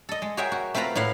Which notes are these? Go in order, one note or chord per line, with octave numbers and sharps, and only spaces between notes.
A4 D#5
G#3
F#4 G#4 A#4 C#5 E5 G5
F#4
A3 C4 F4 B4 A#5 B5
A2 E4 F5 F#5